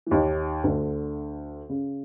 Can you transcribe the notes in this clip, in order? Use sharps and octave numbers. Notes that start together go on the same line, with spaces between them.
E3
D#2 D#3
D2 D3
C#3